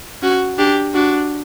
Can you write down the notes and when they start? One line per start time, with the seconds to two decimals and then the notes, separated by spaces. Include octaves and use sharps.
0.22 C#4 F#4
0.59 D4 G4
0.94 D4 F#4